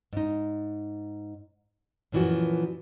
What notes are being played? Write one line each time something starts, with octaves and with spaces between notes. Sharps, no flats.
G#2 D#4
F#2 A#2 E3 F3 F#4